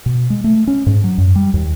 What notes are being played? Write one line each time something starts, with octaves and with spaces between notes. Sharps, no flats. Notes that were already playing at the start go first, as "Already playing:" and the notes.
B2
G#3
A3
C#4
G#2
F#3
F#2
G3
D#2